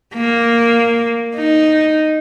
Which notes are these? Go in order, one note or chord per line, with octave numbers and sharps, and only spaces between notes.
A#3
D#4